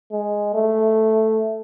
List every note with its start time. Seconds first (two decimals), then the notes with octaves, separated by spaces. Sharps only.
0.12 G#3
0.55 A3